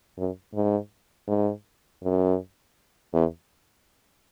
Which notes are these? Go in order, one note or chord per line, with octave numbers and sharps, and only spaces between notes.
F#2
G#2
G#2
F#2
E2